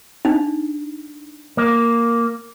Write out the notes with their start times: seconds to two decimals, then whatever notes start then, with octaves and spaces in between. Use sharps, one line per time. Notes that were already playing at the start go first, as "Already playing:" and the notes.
0.25 D4 D#4
1.57 A#3